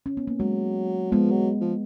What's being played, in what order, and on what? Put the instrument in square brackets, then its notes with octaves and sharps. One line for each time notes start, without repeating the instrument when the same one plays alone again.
[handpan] C#4
B3
A#3
[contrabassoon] F#3 [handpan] G#3
[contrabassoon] F3 [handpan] G#3 B3
[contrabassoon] F#3
F3